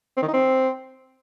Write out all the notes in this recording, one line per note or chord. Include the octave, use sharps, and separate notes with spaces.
C4
D#3
D#4
C4